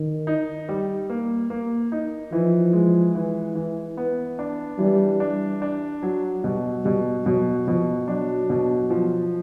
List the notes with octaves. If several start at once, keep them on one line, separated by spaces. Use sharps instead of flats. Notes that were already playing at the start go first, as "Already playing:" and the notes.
Already playing: D#3
D#4
G3
A#3
A#3
D#4
E3 F3
G#3
E3
E3
B3
D4
E3 G3
D4
D4
F#3
B2 G3
B2 G3
B2 F#3
B2 F3
F#3 D4
B2
F3